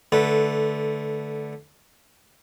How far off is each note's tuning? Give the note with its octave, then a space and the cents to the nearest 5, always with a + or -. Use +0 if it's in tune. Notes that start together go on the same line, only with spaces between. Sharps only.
D3 +0 A3 -15 B4 +0